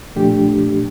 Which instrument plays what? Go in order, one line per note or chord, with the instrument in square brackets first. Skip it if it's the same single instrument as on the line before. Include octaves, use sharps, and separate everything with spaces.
[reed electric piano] A#2 F3 A3 D4 G4